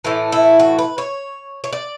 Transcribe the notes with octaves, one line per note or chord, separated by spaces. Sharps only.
A2 E3 A3
E4
F#4
B4
C#5
C#5
D5